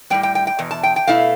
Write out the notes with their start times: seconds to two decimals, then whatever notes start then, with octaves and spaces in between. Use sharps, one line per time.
0.10 A2 G3 B3 G5
0.23 G5
0.35 G5
0.47 G5
0.59 E2 B2
0.71 A5
0.83 G5
0.96 G5
1.07 B2 A3 E4 F5